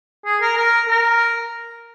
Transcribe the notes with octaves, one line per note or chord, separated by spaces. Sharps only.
G#4
A#4
A#4
A#4